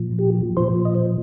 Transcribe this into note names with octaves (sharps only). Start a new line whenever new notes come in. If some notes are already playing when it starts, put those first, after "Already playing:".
Already playing: A#2 F3
G4
A#2 F3 C5
D#5
C5